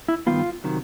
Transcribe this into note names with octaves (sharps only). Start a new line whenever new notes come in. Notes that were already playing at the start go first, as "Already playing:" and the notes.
E4
G2 D#3 G3 B3 F4
C3 D#3 F#3